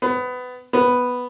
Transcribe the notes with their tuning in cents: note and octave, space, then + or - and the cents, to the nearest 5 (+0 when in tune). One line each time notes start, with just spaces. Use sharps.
B3 +20
B3 +0